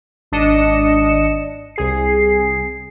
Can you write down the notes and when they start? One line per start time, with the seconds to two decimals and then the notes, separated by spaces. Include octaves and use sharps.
0.32 G#1 D4 D#5 C#7 E7
1.76 C2 G#4 C7